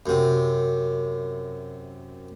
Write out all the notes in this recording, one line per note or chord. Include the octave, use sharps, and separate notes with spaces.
F#2 C3